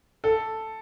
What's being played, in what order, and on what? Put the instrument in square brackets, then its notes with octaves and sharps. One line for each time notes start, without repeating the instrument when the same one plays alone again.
[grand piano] A4